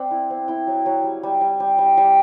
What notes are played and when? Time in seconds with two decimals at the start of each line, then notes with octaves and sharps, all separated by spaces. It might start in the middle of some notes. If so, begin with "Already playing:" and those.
Already playing: C4 D5 F#5
0.11 E4
0.30 C4
0.48 E4 G5
0.67 F#3
0.86 F#3
1.04 G3
1.23 G3
1.41 G3
1.60 G3
1.79 G3
1.97 G3